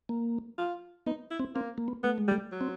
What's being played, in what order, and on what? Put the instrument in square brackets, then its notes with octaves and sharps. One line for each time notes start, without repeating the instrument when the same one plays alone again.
[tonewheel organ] A#3
[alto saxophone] F4
[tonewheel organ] B3 [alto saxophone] D#4
[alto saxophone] E4
[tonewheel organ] C4
[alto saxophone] A#3 [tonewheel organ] C4
[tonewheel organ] A#3
B3
[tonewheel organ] A3 [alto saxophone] B3
[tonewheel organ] G#3
[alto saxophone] G3
[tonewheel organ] A3
[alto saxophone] F#3
[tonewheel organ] C4